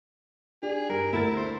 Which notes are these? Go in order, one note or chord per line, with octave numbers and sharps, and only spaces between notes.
D4 G4 G#4
G2 A#4
D2 E4 A#4 A6
C5